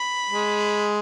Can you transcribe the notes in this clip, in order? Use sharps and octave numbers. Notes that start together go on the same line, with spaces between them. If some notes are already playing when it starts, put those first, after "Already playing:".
Already playing: B5
G#3